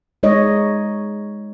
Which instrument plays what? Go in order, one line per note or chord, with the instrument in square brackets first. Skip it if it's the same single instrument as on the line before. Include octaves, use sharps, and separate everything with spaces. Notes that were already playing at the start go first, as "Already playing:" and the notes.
[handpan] G#3 D#4 C#5 D#5